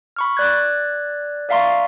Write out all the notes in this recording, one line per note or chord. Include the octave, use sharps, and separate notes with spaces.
B5 C#6 F6
D5 F#6 G#6
D5 E5 F5 A#5 C6 C#6